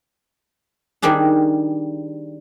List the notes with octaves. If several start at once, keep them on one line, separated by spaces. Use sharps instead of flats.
D#3 G3 C4 D4 G#4